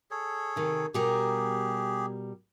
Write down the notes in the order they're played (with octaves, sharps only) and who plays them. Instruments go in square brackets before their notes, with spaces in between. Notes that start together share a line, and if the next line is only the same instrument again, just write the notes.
[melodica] G#4 A4 C#5
[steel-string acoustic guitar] C3 D#3
[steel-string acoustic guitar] B2 G3 A#4 [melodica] G4 G#4